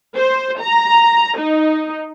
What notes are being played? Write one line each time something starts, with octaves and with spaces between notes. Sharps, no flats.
C5
A#5
D#4